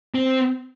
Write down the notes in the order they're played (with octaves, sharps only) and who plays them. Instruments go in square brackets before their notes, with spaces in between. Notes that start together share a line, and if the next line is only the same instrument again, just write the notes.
[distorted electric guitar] C4